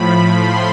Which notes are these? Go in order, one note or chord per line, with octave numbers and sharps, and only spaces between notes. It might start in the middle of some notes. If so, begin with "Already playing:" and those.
Already playing: A2 F3 B5
C6